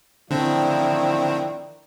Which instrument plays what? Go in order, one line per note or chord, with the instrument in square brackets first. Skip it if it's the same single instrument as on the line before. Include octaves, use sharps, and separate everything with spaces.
[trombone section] A1 F3 E4 [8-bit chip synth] D3 C4 [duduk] D#3 [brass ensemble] D5